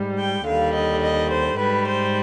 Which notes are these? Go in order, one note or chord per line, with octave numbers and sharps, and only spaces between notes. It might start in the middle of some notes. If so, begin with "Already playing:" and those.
Already playing: G#2 G3
G5
D#2 D3 G3 F5
D#5
D#5
C5
G#2 G3 B4
C5